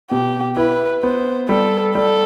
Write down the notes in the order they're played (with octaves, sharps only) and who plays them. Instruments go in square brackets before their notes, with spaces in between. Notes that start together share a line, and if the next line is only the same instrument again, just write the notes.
[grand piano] B2 [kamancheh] G4
[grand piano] E4 [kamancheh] B4
[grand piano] B3 [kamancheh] C5
[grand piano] G3 [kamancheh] A4
[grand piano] G3 [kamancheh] A4